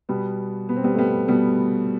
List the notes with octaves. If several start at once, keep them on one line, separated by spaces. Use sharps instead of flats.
B2 G3 B3
B2 B3
C4
G3 B3
A3
G3 B3
B2 G3 B3